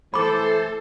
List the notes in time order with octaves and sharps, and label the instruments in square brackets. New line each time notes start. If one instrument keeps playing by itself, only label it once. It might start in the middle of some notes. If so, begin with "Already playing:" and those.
[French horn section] E3 A3 [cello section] A4 [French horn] C5 [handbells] B5 D6